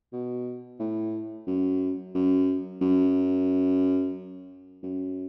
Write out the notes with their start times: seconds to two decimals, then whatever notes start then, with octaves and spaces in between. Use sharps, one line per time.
0.12 B2
0.79 A2
1.47 F#2
2.14 F#2
2.81 F#2
4.83 F#2